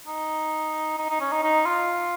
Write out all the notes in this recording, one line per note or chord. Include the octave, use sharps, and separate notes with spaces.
D#4
D#4
D#4
C#4
D#4
D#4
F4